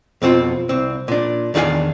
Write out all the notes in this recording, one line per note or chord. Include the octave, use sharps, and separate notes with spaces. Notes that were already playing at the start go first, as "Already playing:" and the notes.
F2 B2 C4 F4
C2 C4
A#2 D4
E2 D#3 D4 G#4 F5 G#5